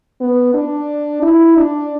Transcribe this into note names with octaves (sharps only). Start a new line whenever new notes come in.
B3
D4
E4
D4